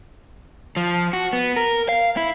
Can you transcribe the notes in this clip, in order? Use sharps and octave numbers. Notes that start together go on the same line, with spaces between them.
F3
F#4
B3
A#4
F5
E4